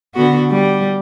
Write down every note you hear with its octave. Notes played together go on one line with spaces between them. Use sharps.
D3 B3 F#4
G3